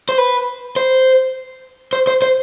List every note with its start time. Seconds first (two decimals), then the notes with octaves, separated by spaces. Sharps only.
0.09 C5
0.18 B4
0.76 C5
1.93 C5
2.07 C5
2.22 C5